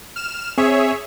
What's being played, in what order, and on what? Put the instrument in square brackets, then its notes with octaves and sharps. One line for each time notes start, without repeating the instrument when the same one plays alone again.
[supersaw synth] F6 E7
[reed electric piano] C4 [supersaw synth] G#4 C#5 E5